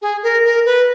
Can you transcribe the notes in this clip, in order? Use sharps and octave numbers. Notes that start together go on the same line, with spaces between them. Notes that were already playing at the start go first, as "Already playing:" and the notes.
G#4
A#4
A#4
B4